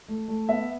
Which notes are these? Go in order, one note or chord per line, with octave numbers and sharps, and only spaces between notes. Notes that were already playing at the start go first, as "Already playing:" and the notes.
A3
A3
B3 E5